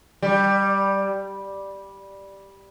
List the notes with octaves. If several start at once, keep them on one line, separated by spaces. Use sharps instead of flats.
G3